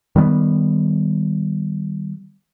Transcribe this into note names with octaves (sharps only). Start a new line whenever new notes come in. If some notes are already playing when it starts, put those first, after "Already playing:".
D#3 G3 A3 B3